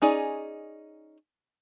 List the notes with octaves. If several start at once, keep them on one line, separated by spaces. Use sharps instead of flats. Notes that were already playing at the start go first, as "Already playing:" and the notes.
C#4 D#4 G#4 D5